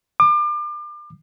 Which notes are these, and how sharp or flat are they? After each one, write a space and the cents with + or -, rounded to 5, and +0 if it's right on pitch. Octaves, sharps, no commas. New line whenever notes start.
D6 +35